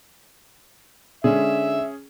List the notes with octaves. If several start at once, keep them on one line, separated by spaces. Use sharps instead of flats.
D3 G#3 C#4 G#4 E5